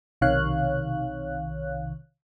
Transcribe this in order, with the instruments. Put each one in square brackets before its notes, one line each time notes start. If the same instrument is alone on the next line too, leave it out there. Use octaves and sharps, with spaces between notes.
[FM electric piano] B1 C3 D#3 C#5 F5 F#6